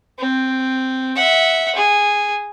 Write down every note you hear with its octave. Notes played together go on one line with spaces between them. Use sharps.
C4
E5 F#5
G#4